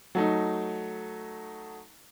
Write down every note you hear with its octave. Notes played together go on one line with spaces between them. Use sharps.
F#3 A3 D#4